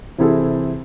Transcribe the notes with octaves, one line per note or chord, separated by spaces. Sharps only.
C3 E3 C4 E4 G#4 A4